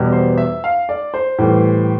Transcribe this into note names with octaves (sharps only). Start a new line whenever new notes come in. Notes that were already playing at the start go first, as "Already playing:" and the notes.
Already playing: E2 B2 G3
C5
E5
F5
D5
C5
A2 E3 G3